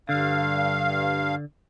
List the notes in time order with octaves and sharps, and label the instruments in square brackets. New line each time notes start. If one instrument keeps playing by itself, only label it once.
[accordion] G2 F5 [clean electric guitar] D3